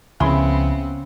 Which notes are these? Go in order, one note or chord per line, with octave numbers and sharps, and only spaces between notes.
C#2 C#3 F3 B3 C4 E4 G#4 C6